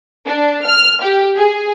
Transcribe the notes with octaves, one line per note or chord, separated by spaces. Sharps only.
D4
F6
G4
G#4